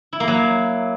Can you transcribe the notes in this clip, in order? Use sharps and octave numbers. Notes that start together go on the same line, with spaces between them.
E4
A#3
F#3